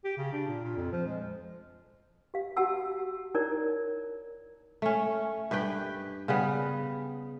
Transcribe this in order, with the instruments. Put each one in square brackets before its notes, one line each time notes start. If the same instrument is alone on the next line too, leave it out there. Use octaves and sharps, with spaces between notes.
[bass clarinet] G4
C#3
D4
A#2
A#2
F2
F3
G#3
[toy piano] G4 F5
F#4 G4 F#5 A5 E6
D#4 E4 A#4 C#5 D5
[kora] A3 C#4
G2 G4 B4 G5
C#3 G3 B3